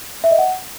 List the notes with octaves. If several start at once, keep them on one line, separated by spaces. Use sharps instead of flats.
E5
D#5
F#5